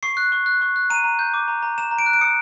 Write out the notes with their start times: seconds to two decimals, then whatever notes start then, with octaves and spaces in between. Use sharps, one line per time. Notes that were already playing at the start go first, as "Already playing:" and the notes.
0.03 C#6 C7
0.17 F#6
0.32 C#6
0.46 F#6
0.61 C#6
0.76 F#6
0.90 A#5 D#7
1.04 A#5
1.19 G6
1.34 D6
1.48 A#5
1.63 A#5
1.78 A#5 E7
1.91 A#5
1.98 D7
2.06 F#6
2.13 D7
2.21 D#6 C#7